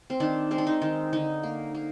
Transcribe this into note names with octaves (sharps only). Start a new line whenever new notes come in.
C4
D#3 D4
G#3 C4
D4
D#4
D#3
D3 D#4
A#3
A#3